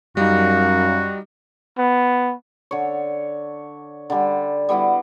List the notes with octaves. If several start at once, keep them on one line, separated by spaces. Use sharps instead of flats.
F#2 G3 D#4 F#4 F5
B3
D3 C#5
D3 G3
G3 B3 E4 F#4